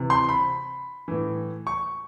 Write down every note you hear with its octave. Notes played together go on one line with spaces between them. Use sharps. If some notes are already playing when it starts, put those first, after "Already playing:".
Already playing: C3 E3
C6
B5
A2 E3
C#6